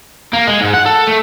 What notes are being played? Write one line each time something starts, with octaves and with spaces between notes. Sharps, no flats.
A#3
G#3
G#2
F#5
A4
A3